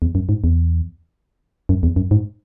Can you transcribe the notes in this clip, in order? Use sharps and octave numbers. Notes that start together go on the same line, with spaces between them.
E2
F#2
G#2
E2
F#2
E2
F#2
G#2